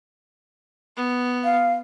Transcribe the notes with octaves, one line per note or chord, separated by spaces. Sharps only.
B3
F5